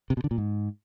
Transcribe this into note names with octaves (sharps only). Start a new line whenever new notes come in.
C3
B2
D3
A#2
G#2